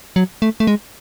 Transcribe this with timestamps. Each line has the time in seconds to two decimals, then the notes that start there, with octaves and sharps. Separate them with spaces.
0.16 F#3
0.42 A3
0.60 A3
0.67 G#3